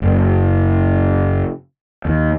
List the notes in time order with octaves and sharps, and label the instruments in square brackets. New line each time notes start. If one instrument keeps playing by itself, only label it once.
[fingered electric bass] F#1
D#2